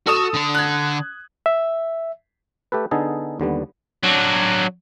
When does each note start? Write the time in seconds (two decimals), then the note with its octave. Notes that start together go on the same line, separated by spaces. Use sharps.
0.07 F#4 A4 D#6 E7
0.34 D3 D5
0.54 F#6 G#6
1.46 E5
2.72 A3 G4 A4 B4
2.91 D3 B3 D#4 G#4 A4
3.40 D#2 D3 G3 B3
4.03 F#3 D4